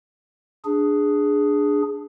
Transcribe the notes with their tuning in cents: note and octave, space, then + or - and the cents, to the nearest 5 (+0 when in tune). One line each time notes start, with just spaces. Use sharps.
D4 +5 G#4 +0